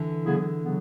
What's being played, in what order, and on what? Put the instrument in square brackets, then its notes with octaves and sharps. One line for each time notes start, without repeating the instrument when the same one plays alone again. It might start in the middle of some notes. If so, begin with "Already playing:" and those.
Already playing: [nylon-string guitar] D3 E3
[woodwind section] C#3 F#3 B3 E4 G#4
C#3 F#3 B3